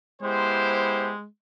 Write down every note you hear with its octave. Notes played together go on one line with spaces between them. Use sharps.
G#3 B3 E4 G4 C5